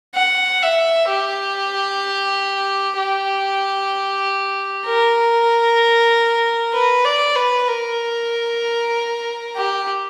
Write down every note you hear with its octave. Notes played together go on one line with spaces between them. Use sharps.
F#5
E5
G4
G4
A#4
B4
D5
B4
A#4
G4